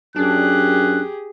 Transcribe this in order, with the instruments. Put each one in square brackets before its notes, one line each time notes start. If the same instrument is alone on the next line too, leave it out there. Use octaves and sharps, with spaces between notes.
[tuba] F#2 [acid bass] D4 [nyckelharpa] G4 G#4 [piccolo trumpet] F#6